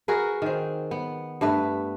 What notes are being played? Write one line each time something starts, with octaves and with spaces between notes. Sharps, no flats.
F#4 G#4 A#4 B4
D#3 C4
B3
G2 A3 B4